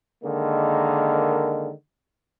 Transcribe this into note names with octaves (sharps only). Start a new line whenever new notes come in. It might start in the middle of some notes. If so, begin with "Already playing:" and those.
D3 D#3 G#3 A#3